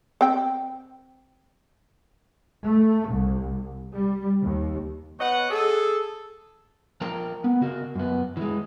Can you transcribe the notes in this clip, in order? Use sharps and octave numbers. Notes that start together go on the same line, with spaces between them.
C4 G5
A3
C2
G3
D#2
B3 C#5 D#5 F#5
G#4 A4
F3 A#4 G5 A5 A#5
B3
C#3 F#4 A#4
F#2 B3
E3 G#3